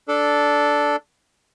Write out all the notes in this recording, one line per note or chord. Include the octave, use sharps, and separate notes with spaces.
D4 A4